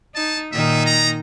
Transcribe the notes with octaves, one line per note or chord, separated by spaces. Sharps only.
D#4 A5
A#2 D#3 D#4 E5
A#5